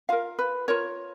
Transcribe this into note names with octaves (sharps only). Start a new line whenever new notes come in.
F4 A#4 F5
B4
F4 A#4 C#5